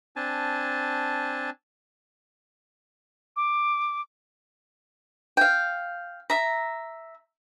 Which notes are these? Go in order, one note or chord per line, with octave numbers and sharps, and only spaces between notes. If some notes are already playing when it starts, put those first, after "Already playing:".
C4 D4 G#5 A5
D6
F5 G5
E5 A#5